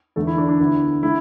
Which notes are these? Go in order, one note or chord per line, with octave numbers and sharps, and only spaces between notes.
E2 D3 A3 A4
E4
D4
D4
D2 D3 B3 E4
D3 A3 E4